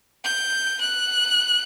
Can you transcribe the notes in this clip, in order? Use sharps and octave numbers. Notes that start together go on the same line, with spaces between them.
G6
F#6